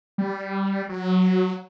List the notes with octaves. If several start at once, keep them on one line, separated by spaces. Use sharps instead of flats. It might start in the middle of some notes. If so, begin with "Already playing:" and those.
G3
F#3